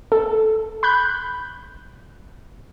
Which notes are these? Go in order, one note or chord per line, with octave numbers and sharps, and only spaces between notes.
A4
B5 F#6 G6